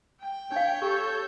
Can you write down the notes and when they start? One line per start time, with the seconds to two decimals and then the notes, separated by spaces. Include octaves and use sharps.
0.20 G5
0.52 D4 C#5 F5 G6
0.82 G4 A4 C#6